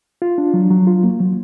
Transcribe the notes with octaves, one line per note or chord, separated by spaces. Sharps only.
F4
D4
F#3
F#3
F4
A#3
F#3